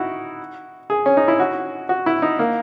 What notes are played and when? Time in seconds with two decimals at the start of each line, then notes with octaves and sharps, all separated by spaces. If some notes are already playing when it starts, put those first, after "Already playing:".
Already playing: D#4 E4 F#4
0.90 G#4
1.06 C#4
1.17 D#4
1.28 E4
1.40 F#4
1.89 F#4
2.06 E4
2.22 D#4
2.39 A#3